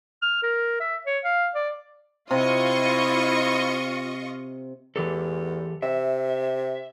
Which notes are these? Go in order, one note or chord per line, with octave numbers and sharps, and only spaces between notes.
F6
A#4
E5
C#5
F5
D5
C3 E4 F4 D#5 C#6
E2 E3 G4 A4
C3 E5